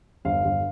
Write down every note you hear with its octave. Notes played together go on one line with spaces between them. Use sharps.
G1 F5
G1